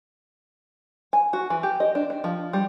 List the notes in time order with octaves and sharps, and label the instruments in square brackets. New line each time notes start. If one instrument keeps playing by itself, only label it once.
[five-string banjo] G#5
F#4
E3
G4
D#5
D4
D4
F3
G3